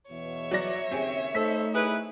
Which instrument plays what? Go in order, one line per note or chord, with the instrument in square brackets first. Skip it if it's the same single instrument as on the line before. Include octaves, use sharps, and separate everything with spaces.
[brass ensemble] E2 B2 [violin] C#5 E5
[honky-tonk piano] F#3 D5 A#6
[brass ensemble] D#2 C#3 [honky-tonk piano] C4 G4 G#4
[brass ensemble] A3 D#4 [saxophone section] A4 C5 [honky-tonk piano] B6
[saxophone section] E4 G#4 B4